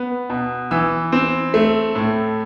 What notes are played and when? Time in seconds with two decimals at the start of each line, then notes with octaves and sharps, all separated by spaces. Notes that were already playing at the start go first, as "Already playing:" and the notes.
Already playing: B3
0.30 B2
0.71 E3 E6
1.12 C4
1.54 A3
1.95 A2